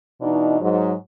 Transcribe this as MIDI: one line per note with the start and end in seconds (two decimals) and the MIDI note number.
0.21 0.59 47
0.21 0.59 52
0.21 0.59 62
0.21 0.59 63
0.61 0.94 44
0.61 0.94 54